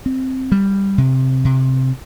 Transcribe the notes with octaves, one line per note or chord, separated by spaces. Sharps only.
C4
G3
C3
C3